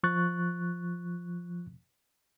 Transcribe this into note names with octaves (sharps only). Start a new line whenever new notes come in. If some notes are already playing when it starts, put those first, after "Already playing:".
F3 C#6 F#6 A6